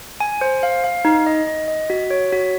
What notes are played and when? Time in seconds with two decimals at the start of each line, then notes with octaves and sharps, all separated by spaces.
0.20 G#5
0.41 C5
0.63 F5
0.84 F5
1.05 D#4
1.26 D#5
1.48 D#5
1.68 D#5
1.90 F#4
2.10 C#5
2.32 F#4